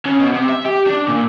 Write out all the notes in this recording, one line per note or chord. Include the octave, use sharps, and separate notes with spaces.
C#3
B2
C3
E5
G4
D4
A#2